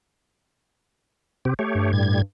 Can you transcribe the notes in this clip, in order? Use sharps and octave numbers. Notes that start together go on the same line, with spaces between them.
C3 C4 G4
A3 G4 C#5
G2
A2 G3 G#6